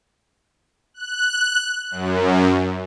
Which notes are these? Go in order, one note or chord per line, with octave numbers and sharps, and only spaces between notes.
F#6
F#2